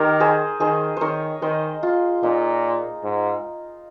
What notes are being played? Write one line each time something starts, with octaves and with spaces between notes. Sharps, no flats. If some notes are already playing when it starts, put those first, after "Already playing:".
Already playing: D#3 G4 A#4
G#4 C5
D#3 G#4 C5
D#3 A#4 C5 C#5
D#3 C5 D#5
F4
A#2 D#4
G#2